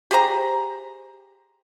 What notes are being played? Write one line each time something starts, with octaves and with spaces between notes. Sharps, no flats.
G4 G#4 C5 A#5